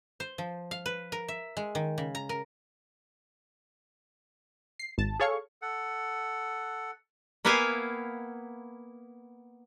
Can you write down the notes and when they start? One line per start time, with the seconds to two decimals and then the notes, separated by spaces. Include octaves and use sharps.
0.20 C5
0.38 F3
0.71 F5
0.86 B4
1.12 A#4
1.28 E5
1.57 G#3
1.75 D#3
1.98 C#3
2.15 A#5
2.29 A#4
4.79 C7
4.98 G#1 A5
5.20 G#4 A4 C#5 F5 C#6
5.62 A4 F#5
7.45 A#3 B3 E4 F5 G5 G#5